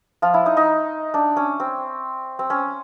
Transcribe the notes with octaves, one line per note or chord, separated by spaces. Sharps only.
F3 F4
E4
D#4
D#4
D4
C#4
C4
C4
C#4